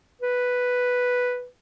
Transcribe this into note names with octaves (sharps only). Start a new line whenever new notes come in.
B4